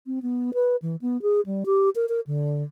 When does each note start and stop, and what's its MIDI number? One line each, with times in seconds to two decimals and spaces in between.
0.06 0.19 60
0.22 0.51 59
0.54 0.76 71
0.82 0.96 52
1.02 1.20 59
1.22 1.41 68
1.46 1.64 55
1.66 1.90 67
1.96 2.06 70
2.09 2.20 70
2.27 2.63 50